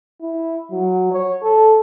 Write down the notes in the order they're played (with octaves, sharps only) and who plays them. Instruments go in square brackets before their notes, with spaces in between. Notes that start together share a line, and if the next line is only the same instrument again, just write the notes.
[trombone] E4
F#3
C#5
A4